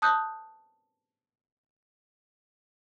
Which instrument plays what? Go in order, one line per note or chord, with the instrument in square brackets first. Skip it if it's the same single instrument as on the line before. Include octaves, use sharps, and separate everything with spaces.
[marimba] A5 D#6 F#6 G6